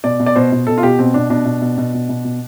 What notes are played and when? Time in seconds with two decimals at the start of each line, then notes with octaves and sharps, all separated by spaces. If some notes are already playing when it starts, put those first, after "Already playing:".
0.04 B2 D5
0.19 B2
0.26 D5
0.36 B2 C5
0.52 B2
0.67 B2 A4
0.78 F4
0.83 B2 G4
0.99 B2 C4
1.14 B2 D4
1.30 B2 D4
1.45 B2
1.62 B2
1.78 B2
1.94 B2
2.09 B2
2.24 B2